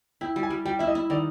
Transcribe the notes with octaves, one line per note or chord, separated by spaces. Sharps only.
E4 G5
G3
G#5
G3
G3 G5
E4 E5
D#5
E4
D#3 D5